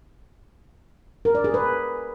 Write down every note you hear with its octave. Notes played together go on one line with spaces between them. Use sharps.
A#4
D5
G#4
B4